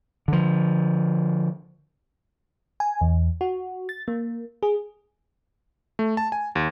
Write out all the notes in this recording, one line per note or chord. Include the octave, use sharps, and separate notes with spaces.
D3 F3
G#5
E2
F#4
A6
A#3
G#4
A3
A5
G#5
D#2